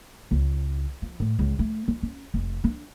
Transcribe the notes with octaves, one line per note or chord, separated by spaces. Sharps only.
C#2
F3
A2
C#2
A3
D#4
C#4
F1
D4